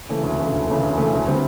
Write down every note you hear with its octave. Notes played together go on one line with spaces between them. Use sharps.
C#3 E3 A3
D2
C#3 E3 A3
D2
C#3 E3 A3
D2
C#3 E3 A3
D2
D3 G3 C4 E4